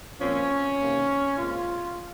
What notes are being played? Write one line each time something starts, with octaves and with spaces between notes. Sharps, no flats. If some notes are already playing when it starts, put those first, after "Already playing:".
A#2 F3 C4 C#4
C3 D#3 A#3
A#2 G#3 C4 F4